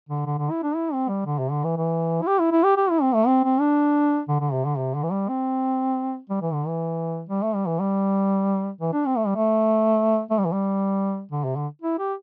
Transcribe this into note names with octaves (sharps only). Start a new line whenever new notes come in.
D3
D3
D3
E4
D4
E4
C4
G3
D3
C3
D3
E3
E3
E4
G4
E4
E4
G4
G4
E4
C4
A3
C4
C4
D4
D3
D3
C3
D3
C3
D3
E3
G3
C4
G3
E3
D3
E3
G3
A3
G3
E3
G3
E3
D4
C4
A3
G3
A3
A3
G3
E3
G3
D3
C3
D3
E4
G4